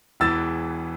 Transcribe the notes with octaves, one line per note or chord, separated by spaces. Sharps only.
E1 E2 E3 E6 A6